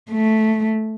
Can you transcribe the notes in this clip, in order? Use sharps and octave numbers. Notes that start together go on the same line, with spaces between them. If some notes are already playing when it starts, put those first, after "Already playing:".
A3